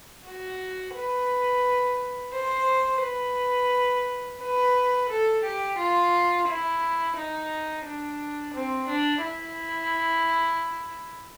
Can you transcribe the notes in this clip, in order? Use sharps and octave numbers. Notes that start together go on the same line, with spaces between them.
F#4
B4
C5
B4
B4
A4
G4
F4
E4
D#4
D4
C4
D4
E4